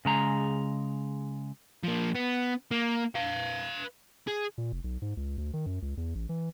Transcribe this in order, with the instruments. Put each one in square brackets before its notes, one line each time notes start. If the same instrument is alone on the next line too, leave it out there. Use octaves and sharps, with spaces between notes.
[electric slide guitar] C#3 G#3 A#5
[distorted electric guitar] F3 A#3
B3
A#3
B4 F5
G#4
[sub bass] A#2
F1
B1
G#2
C#2
D2
D#3
F#2
C#2
E2
A1
E3